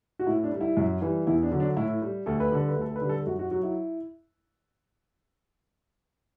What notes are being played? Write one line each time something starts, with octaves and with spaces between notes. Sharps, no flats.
F#4
A2 E4
D4
G3
E4
F#2
E3 G3
E2 E4
D4
D3 F#3
D4
A2 E4
G3
D2 A4
B4
D3 G3 A4
B4
D2
A4
B4
D3 G3
A4
F#2 F#4
F#4
F#3 F#4
E4